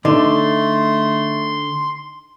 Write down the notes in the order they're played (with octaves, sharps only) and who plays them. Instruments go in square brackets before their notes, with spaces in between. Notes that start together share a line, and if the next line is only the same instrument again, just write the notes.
[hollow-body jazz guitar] D3 [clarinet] A3 [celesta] D#4 D#5 [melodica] C6